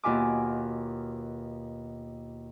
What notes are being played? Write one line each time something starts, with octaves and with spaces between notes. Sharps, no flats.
D#2 B2 F4 E5 G#5 D6